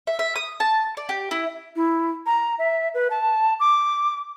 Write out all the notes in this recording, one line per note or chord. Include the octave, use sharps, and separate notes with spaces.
E5
E5
D#6
A5
D5
G4
E4
E4
A#5
E5
B4
A5
D6